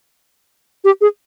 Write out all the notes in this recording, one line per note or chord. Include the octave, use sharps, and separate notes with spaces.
G4
G#4